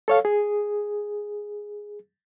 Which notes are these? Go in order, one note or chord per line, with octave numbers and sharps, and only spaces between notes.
A4 C#5 F5
G#4